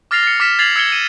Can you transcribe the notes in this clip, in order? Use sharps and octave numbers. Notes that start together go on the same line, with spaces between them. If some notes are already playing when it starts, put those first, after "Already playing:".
D6 F6 A6 A#6 C7 F7
A6 C#7
D6 F6 B6 E7
G#6 A6 C7 F7 F#7
E6 G#6 C#7 G7
D#7 E7